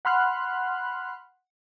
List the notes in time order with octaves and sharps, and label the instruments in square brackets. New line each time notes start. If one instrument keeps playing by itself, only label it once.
[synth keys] F#5 B5 C6 F6 F#6